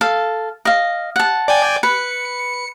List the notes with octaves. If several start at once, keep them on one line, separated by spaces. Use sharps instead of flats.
A4 F5
D#5 F5
F#5 A5
D5 G5 G#5
B4 C#7